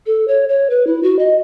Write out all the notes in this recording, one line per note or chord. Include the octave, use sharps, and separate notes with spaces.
A4
C#5
C#5
B4
E4
F#4
D#5